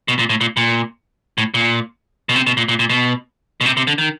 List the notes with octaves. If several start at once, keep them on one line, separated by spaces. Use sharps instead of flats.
B2
A#2
A2
A#2
A#2
A2
A#2
B2
C3
B2
A#2
A#2
A#2
B2
B2
C3
C3
D3
D#3